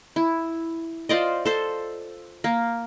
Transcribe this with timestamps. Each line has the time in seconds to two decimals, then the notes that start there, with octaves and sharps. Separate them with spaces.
0.16 E4
1.09 F4 C5 D5 D#5
1.45 A4 C5
2.44 A#3